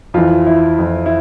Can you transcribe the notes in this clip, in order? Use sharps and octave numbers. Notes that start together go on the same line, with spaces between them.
F2 E3 F4
E4
F2 E3
E4